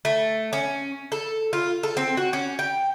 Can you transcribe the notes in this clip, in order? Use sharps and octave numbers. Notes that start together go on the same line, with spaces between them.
A3
C#4
A4
F4
A4
C4
F#4
C#4
G5